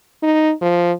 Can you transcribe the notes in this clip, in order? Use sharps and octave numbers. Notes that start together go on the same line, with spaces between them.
D#4
F3